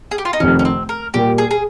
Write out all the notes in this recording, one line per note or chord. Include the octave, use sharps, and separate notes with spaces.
G#4
G4
F4
D#4
F1 F2 C3 D#3 C#4
C#4
C4
A#4
A#2 G3 A#3 G4
G#4
G#4